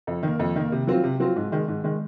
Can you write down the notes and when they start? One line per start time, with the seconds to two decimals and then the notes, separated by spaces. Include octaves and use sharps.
0.07 F2
0.23 D#3 A#3
0.39 F2
0.56 D#3 A#3
0.72 C3
0.87 F#3 C4 F4
1.04 C3
1.20 F#3 C4 F4
1.36 G#2
1.52 D#3 G#3
1.68 G#2
1.84 D#3 G#3